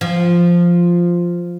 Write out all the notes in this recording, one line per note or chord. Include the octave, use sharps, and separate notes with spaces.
F3